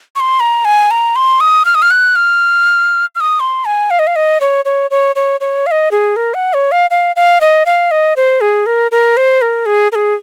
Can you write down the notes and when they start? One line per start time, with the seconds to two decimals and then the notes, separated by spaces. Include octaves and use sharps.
0.16 C#6
0.20 C6
0.40 A#5
0.65 G#5
0.91 A#5
1.16 C6
1.40 D#6
1.65 F6
1.75 D#6
1.82 F6
1.91 F#6
2.16 F6
3.15 F6
3.20 D#6
3.40 C6
3.65 G#5
3.91 F5
3.99 D#5
4.07 F5
4.16 D#5
4.41 C#5
4.65 C#5
4.91 C#5
5.16 C#5
5.41 C#5
5.67 F5
5.71 D#5
5.91 G#4
6.16 A#4
6.34 F#5
6.54 C#5
6.72 F5
6.91 F5
7.16 F5
7.41 D#5
7.66 F5
7.91 D#5
8.16 C5
8.41 G#4
8.66 A#4
8.91 A#4
9.17 C5
9.42 A#4
9.66 G#4
9.92 A#4
9.95 G#4